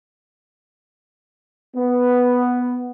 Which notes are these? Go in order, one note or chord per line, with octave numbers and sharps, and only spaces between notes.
B3